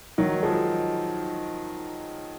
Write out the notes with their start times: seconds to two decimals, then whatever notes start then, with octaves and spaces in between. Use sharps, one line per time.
0.18 D#3 F#3
0.43 F3 G#3